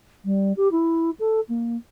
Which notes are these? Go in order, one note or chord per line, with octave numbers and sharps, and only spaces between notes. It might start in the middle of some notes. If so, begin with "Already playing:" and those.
G3
G4
E4
A4
A#3